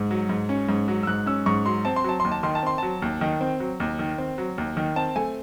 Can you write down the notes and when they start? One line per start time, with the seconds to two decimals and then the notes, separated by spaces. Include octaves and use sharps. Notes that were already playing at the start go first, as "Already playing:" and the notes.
Already playing: G#2
0.11 F#3
0.29 G#2
0.49 C#4
0.69 G#2
0.88 F#3
1.03 E6
1.07 G#2 F#6
1.26 C#4 E6
1.46 G#2 C#6
1.66 F#3 C6
1.85 C4 A5
1.96 C6
2.04 F#3 A5
2.20 D#2 C6
2.32 A5
2.43 D#3 C6
2.55 A5
2.63 C4 C6
2.78 F#3 A5
3.02 D#2
3.21 D#3
3.41 C4
3.60 F#3
3.80 D#2
3.99 D#3
4.18 C4
4.38 F#3
4.58 D#2
4.77 D#3
4.96 C4 A5
5.16 A3 G#5